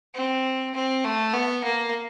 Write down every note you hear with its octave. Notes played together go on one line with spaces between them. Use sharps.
C4
C4
A3
B3
A#3